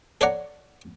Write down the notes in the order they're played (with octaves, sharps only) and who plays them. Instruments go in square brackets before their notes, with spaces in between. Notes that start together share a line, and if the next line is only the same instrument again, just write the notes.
[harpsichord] A4 C#5 D5 F#5 A#5